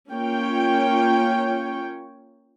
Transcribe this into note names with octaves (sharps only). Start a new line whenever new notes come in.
A#3 C#4 F4 C#5 G5